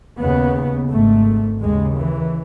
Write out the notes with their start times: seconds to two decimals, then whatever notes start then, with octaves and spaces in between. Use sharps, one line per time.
0.18 D#2 C#3 B3
0.89 G#1 G#2 A3
1.61 D#2 C#3 G#3
1.97 E3